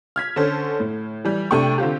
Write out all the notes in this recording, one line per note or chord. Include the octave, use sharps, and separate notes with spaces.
F6 G#6 B6
D3 C#4 A4 C5
A2
E3 G3
C3 A3 D4 A4 G5 C#6
D3 C4 F4 G4